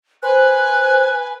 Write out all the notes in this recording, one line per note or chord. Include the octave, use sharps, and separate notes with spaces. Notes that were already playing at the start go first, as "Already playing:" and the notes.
B4 C5 G#5 F#6